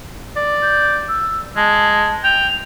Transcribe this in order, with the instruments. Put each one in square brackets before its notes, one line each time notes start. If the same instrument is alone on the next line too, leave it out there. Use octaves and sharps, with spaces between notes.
[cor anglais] D5
[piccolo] G6
E6
[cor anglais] G#3 [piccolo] A5
[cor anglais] G5 [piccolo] F7